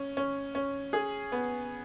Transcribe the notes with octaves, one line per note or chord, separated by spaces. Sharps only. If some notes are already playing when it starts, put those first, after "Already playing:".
Already playing: C#4
C#4
C#4
G#4
B3